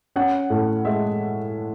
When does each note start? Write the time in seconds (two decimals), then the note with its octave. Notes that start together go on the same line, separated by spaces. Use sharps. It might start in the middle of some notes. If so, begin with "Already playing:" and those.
0.16 C#4 F#5
0.50 A2
0.85 G#3 E5